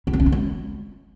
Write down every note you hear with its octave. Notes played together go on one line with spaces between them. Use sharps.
E4
B3
C#4
E4
G#3